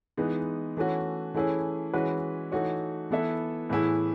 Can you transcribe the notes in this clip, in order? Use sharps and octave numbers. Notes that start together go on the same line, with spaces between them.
E3 G#3 B3 D#4
E3 A3 C#4 F#4
E3 A3 C#4 E4 G#4
E3 G#3 C#4 F#4 B4
E3 A3 D#4 F#4 C#5
E3 B3 E4 A4 E5
A2 E3 B3 E4 G#4